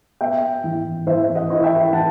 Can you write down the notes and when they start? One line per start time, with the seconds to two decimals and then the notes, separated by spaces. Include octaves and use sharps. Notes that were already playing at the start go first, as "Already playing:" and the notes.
0.21 B3 E5 G5
0.64 E3
1.07 E3 C5 E5
1.35 D#5 F#5
1.50 E4
1.64 E5 G5
1.93 E3 F#5 A5